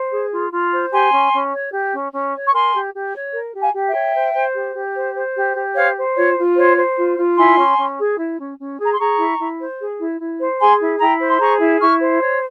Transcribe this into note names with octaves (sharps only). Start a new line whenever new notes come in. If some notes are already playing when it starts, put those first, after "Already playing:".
Already playing: C5
G#4
F4
F4
C5
G4 G#5 C6
C#4
C#4
C#5
G4
C#4
C#4
C#5
C#6
A#4 G#5 C6
G4
G4
C#5
A#4
G4
F5 G#5
G4
E5 G5
C#5
C5
C5
G4
G4
C5
C5
G4
G4
C5 C#5 F5
C5
F4 C#5
F4
C5 C#5
C5
F4
F4
E4 G#5 C6
C#4
C#4
G#4
E4
C#4
C#4
G#4
A#5
C6
G#4 A#5 C#6
E4
E4
C5
G#4
E4
E4
C5
G#4 G#5 C6
E4
E4 G5 A#5
C5
C6
G#4 A#5 C#6
E4
E4 C#6 F6
C5
C#5